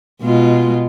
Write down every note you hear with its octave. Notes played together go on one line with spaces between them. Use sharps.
B2 G#3 F4